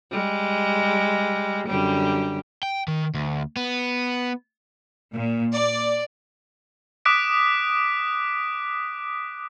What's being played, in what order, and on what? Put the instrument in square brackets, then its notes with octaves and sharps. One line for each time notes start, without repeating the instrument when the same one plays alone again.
[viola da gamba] G3 G#3
F#2 D3 G3
[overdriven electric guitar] G5
D#3
D2
B3
[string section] A#2
D5
[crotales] D6 D#6 F#6 B6 D7